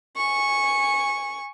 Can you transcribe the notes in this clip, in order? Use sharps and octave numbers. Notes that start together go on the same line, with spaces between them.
G#5 C#6